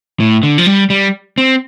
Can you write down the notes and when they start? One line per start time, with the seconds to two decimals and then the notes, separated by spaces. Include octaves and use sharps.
0.20 A2
0.43 D3
0.58 F3
0.66 G3
0.90 G3
1.38 C4